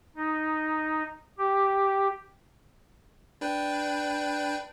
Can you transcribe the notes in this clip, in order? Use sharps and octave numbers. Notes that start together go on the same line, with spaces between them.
D#4
G4
D4 B4 G5